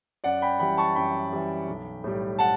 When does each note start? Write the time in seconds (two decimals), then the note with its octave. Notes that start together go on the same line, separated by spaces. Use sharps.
0.24 F#2 D5 F#5
0.42 G5 B5
0.59 E3 G3 G5 B5
0.77 A5 C#6
0.95 F#2 G5 B5
1.32 E3 G3
1.67 B1
2.04 A2 G3
2.39 F#5 A5